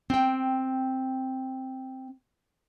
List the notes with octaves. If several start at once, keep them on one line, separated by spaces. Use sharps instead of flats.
C4 G5